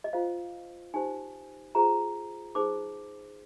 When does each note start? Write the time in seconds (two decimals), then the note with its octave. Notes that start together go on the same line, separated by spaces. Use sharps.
0.04 D#5
0.13 F4 C5 F5
0.94 D#4 G4 C5 G#5
1.75 F4 G#4 C5 A#5
2.55 D#4 G#4 C5 D6